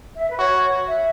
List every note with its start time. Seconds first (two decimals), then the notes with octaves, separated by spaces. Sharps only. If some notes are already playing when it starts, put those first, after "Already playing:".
0.16 E5
0.30 B4
0.39 F#4 C#5
0.87 E5